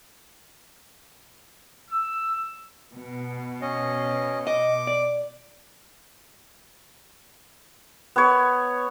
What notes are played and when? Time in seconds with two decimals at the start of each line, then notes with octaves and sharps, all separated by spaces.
1.91 E6
2.93 B2
3.61 C#4 D#5
4.47 D#5 D6
4.87 D5
8.16 B3 C#5